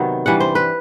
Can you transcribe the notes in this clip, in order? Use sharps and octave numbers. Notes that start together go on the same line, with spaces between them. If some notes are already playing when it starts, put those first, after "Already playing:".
Already playing: C3 D#3 F#3 B3
G2 E3 G3 F#5
C5
B4